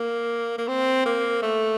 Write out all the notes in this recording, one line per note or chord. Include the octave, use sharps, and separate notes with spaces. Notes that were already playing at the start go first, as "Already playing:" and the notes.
Already playing: A#3
A#3
C4
A#3
A3